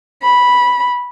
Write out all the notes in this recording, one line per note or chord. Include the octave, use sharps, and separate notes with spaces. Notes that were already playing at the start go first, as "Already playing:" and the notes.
B5